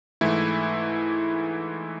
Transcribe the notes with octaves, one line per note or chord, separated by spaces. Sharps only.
G#2 E3 A3 E4